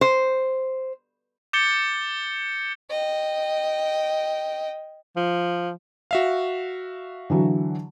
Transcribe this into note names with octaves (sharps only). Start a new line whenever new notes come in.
C5
D6 G6 A6 C#7 G7
D#5 G5
F3
F#4 E5 F5
D3 E3 F#3